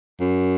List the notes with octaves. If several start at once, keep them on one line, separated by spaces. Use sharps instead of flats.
F#2